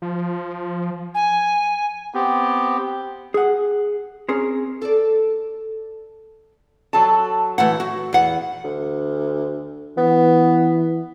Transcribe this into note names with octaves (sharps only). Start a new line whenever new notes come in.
F3
G#5
B3 C4 G4
G#4 F#5
C4 C#4 G#4 A#4
A4 D5
F#3 A4 A5
E3 A3 F#5
F#4
E2 F#5
D2
E3 B3